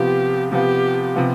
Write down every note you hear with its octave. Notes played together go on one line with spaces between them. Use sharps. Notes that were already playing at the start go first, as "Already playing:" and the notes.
Already playing: C3 F3 B3 F4 G4
C3 F3 B3 F4 G4
C3 F3 B3 F4